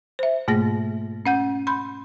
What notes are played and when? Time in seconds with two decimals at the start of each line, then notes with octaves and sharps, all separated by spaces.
0.19 C5 E5
0.48 G#2 B2 A3 A#3 G#4 A#6
1.26 C#4 F#5 G6
1.67 B5 C6 G6